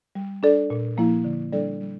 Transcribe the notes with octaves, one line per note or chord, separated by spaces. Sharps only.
G3
D4 A4 D5
A#2
F3 A#3 E4
D3
G3 D4 A4 D5
G3